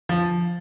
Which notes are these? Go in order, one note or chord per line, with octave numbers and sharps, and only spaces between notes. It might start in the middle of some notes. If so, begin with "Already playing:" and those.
F3